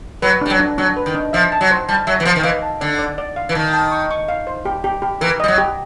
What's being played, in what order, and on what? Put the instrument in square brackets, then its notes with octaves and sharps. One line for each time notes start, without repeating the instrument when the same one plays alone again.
[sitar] F#3 [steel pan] B4
[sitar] G3 [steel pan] D4
[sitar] F#3
[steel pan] D4
[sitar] F#3 [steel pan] D4
[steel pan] B4
[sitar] D#3
[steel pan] D4
[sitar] F3 [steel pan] E5
[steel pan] A5
[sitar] F#3
[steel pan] C5
[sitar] G3 [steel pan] A5
[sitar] F#3 [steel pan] E5
[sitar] E3
[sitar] F3 [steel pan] C5
[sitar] D#3
[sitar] E3 [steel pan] F5
[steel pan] A5
[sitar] D3 [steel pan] D5
[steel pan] D5
D5
F5
[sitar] E3
[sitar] D#3 [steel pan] A5
[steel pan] A5
C#6
C#6
F5
C5
G4
G4
G4
[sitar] E3 [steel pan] A#4
[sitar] G3 [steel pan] D#5
[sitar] F#3
[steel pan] G4